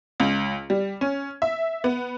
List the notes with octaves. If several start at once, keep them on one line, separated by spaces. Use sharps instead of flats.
C#2
G3
C#4
E5
B3